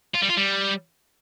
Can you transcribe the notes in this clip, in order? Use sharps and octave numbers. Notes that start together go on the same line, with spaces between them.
F4
G3
F4
G3